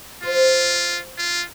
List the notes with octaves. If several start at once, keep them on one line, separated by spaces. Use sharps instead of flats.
F4 C5
F4